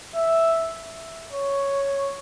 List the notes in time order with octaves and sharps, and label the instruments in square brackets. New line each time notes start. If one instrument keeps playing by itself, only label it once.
[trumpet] E5
C#5